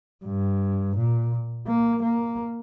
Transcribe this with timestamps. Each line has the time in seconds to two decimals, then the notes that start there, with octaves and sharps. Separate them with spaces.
0.25 G2
0.96 A#2
1.67 A#3
2.02 A#3